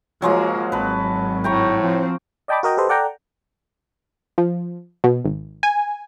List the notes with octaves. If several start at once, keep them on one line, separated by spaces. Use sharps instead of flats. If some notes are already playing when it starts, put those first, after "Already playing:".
F3 F#3 G#3 A#3
G#1 F#3 B4 A5
A2 G5 A#5 C#6
F3 C4
D5 D#5 G5 A5 B5 D6
F#4 A#4 D#5 G5
G4 A4 B4 C5 D#5
A4 D5 F#5 G5 A#5
F3
B2
G#1
G#5